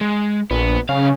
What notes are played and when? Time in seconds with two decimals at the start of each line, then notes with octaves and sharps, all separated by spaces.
0.01 G#3
0.51 A#1 B3
0.89 B1 C#3 F5